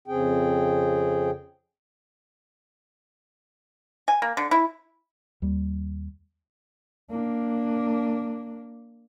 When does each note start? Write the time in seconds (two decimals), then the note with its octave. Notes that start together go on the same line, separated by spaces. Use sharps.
0.08 F2 C#3 C4 G#4 G5
4.08 G#5
4.22 A#3
4.37 D3
4.51 E4
5.42 D#2 G3
7.10 A#3 D4